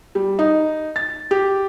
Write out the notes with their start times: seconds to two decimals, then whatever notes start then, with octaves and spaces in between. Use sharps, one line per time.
0.15 G3
0.39 D#4
0.96 A6
1.31 G4